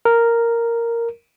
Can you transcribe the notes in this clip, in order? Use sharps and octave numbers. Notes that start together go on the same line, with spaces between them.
A#4